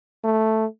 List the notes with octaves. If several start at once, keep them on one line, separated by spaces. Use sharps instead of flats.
A3